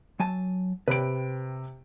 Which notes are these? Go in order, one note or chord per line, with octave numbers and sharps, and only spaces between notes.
F#3 G#5 A5
C3 B4 G5 B5 D7